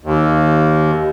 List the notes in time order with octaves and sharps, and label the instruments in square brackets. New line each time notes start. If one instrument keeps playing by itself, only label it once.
[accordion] D#2